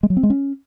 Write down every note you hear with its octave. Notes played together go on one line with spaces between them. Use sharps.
G#3
F#3
C4
G#3
C#4